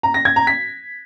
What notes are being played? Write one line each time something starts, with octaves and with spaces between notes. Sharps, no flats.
A#5
A#6
G#6
A#5
B6